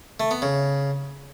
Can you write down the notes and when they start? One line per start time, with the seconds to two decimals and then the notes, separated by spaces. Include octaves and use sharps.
0.20 A3
0.31 B3
0.42 C#3